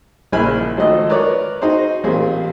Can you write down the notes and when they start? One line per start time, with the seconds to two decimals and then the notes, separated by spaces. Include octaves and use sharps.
0.32 A#1 C#3 E4 G#5 B5 F6
0.77 G#1 F3 F#3 A3 D#5
1.09 A#4 B4 C#5 D5
1.62 D#4 F#4 G#4 C5
2.04 A1 A#2 A#3 C4 G#4